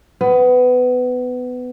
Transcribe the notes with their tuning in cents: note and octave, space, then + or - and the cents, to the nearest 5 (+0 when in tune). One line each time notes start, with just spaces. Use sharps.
B3 +20